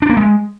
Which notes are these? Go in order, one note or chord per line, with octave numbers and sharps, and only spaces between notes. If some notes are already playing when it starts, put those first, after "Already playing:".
D4
A#3
G#3